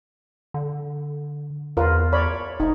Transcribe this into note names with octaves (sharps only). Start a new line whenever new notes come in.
D3
E2 F4 A#4 B4
C#5 D5 B5
E1 D#4